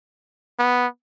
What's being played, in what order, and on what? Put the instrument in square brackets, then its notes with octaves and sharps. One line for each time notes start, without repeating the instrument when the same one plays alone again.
[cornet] B3